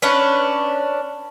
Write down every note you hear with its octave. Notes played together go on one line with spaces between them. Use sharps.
C#4 D4 B4